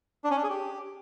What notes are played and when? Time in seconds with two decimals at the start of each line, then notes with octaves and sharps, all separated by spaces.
0.24 D4
0.31 C#4
0.37 D4
0.43 G#4
0.49 G4